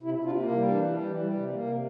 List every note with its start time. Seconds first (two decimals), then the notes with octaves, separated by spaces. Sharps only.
0.03 C3 E4
0.19 C3
0.24 D4 F4
0.36 A#3
0.47 E4
0.52 G3
0.68 E3 D4
0.84 G3
1.01 E3
1.17 G3
1.33 C3
1.50 A#3
1.66 C3